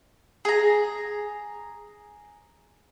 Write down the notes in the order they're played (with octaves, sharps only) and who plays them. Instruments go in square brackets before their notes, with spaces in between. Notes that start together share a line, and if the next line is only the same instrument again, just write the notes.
[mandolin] G#4 A#5